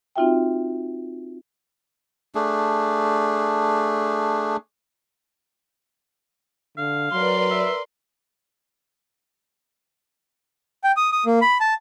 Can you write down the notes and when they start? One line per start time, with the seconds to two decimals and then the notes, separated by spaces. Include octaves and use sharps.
0.16 C4 D#4 F4 F#4 E5 G5
2.35 A3 D4 G#4
6.77 D3 F5
7.12 F#3 A#4 B4 D5 C6
7.51 E5
10.84 G5
10.97 D#6
11.12 D#6
11.26 A#3
11.41 B5
11.60 A5